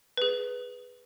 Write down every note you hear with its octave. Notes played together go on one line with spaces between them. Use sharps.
G#4 B4